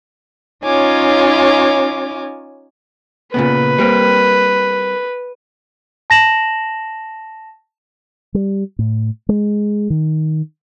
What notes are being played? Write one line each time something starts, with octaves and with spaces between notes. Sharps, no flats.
C#4 D#4 F4 C#5 G#5 D6
A#2 C#3 B3 B4
G3 A#3 C4
A5 A#6 E7 F#7
G3
A2
G#3
D#3